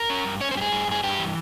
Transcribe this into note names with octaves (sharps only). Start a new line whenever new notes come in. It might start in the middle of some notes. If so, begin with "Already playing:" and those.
Already playing: A#4
C#4
G2
C#4 C#5
C5
G2 G4 G#4
G2
G2 G#4
G2 G4
E3